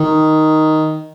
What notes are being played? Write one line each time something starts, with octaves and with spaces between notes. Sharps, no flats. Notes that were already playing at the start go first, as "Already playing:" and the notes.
Already playing: D#3